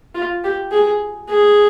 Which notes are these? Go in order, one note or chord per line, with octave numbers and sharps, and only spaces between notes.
F4
G4
G#4
G#4